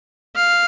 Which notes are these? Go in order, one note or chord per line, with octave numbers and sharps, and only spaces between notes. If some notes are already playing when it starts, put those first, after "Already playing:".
F5